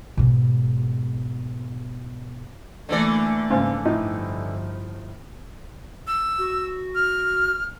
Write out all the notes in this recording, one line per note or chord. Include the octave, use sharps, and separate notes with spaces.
G#2 B2
D3 E3 A3 A#3 D5
G#2 C#3 A#3
G1 A2 F3 D#4
E6
F#4
F6